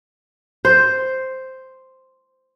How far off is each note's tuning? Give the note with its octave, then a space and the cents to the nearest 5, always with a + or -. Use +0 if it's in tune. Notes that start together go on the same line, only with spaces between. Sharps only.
C5 +0